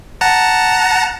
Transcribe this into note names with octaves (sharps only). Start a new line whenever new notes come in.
F#5 A5 A#5